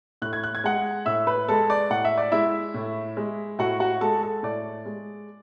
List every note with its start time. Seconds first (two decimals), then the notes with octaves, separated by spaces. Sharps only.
0.22 A2 F#6
0.33 G#6
0.44 F#6
0.55 G#6
0.64 G#3 F#5 F#6
1.06 A2 E5 E6
1.27 B4 B5
1.48 G#3 A4 A5
1.70 D5
1.90 A2 F#5
2.05 E5
2.18 D5
2.32 G#3 E4 E5
2.74 A2
3.17 G#3
3.59 A2 F#4 F#5
3.80 F#4 F#5
4.01 G#3 A4 A5
4.22 A4 A5
4.43 A2 D5
4.85 G#3